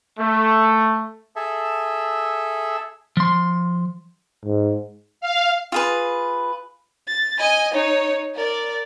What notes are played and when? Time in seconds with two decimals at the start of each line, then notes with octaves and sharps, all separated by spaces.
0.19 A3
1.36 G#4 A4 E5
3.17 F3 C6
4.45 G#2
5.21 F5
5.72 F4 G#4 B4
7.07 A6
7.39 D#5 G#5
7.73 D#4 C#5
8.35 A#4 D5